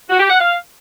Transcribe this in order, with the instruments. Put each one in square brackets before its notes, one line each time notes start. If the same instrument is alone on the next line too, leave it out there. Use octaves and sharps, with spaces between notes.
[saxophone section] F#4
G4
F#5
F5